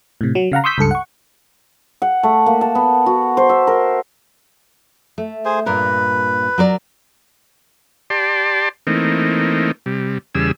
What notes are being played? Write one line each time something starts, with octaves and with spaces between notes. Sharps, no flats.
A2 C3
F#3
C#3 F5 F#5 A#5
C6 C#6 D#6 E6 G6 B6
C#2 G2 A4 C#7
F#5 C#6
F#5
A3
A#3
A5
B3
F#4
C5
E5
A#4
A3
G#4 C5
G2 A#2 A#4 B4
F#3 A#4 D5
G4 D5 A5 C6
E3 A3 A#3 C4 D#4
C3 G3
E2 C#3 G3 G#4 E6